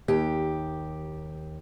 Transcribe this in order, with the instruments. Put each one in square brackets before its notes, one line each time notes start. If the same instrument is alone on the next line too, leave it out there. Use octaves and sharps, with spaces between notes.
[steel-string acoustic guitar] D#2 G4